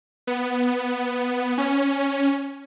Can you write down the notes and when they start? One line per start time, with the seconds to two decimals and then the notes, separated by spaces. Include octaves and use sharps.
0.27 B3
1.58 C#4